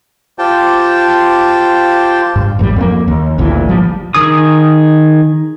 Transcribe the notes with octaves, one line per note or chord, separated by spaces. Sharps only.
F4 G4 C5 G5 A5
G2
A1 F#2 G3
F2 A#3
D#2
G#1 D2 A#2 E3
F3 G3
D#3 G#4 D#6